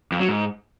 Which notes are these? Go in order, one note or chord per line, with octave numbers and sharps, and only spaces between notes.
F2
F#3
G#2